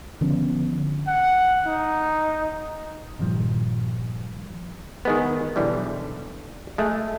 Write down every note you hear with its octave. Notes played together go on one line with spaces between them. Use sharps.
D3 F3 B3 C#4
F#5
D#4
G2 A#2 D#3 F3 G3
D#3 G#3 B3
B1 D3 E3 G3
G#3 A3